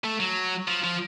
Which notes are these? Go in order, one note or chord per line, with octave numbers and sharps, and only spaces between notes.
A3
F#3
F3
F3